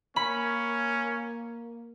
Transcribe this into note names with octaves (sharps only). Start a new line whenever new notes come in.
A#3 C#4 B5